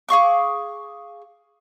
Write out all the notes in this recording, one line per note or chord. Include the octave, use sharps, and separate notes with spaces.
G#4 F5 C#6 D6